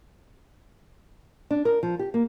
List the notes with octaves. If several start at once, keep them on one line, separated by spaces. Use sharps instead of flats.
D4
A#4
F3
G4
A#3